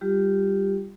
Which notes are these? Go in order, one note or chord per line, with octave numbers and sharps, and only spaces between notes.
G3 F4 G4